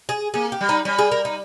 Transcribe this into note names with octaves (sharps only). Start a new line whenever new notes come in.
G#4
A#3 G#4
G4
G3
D#4
G3 C#4
G#4
A#4
D#4